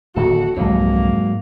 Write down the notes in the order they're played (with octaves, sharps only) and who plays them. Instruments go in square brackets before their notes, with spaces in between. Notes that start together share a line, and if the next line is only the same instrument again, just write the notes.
[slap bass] D1 D#3 A#3 [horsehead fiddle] F#4 [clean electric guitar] A4
[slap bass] C2 F2 [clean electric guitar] G#2 F#3 [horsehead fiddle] A#3